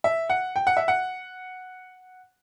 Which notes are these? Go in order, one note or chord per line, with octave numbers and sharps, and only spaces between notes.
E5
F#5
G5
F#5
E5
F#5